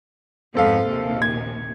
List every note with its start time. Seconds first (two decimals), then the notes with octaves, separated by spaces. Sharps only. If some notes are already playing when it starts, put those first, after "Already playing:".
0.55 F2 G#2 B3 C4 A4 F5
0.85 A#1 D#2 C3
1.22 G#6